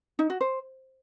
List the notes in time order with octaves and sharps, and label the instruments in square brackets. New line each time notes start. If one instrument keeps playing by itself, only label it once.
[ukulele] D#4
F#4
C5